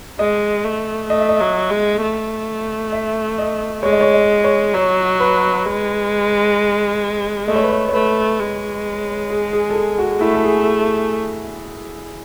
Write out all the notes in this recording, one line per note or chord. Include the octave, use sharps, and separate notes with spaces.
G#3 D#5
A3
A3 D#5
E5
D#5
F#3
G#3
A3
E5
D#5
G#3 C#5
D#5
C#5
D#5
C#5
F#3 C#5
B4
G#3
A3 D#5
C#5
B4
C#5
C#5
A3 B4
G#3
G#4
G#4
A4
G#4
F#4
A3 E4
A4
G#4